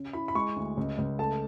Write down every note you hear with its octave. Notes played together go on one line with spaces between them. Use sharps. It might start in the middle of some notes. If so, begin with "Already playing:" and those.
Already playing: C#3
E4 B5
B5
G#3 C#6
D2
C#2
C#2
A3 A5